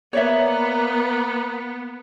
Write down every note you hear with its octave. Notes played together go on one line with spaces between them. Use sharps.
A#3 B3 C#5 D5 E5